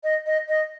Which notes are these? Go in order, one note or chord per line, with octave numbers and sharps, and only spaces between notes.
D#5
D#5
D#5